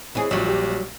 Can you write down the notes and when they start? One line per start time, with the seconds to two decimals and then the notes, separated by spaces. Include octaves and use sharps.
0.15 E3 C4 G#4 C#5 D#5
0.31 E1 A#1 A#2 F#3 G3
0.48 G4